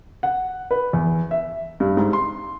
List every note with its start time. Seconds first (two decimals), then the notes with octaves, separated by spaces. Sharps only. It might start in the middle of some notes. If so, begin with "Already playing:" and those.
0.23 F#5
0.71 B4
0.93 E2
1.31 E5
1.80 G2
1.97 G#2
2.13 C6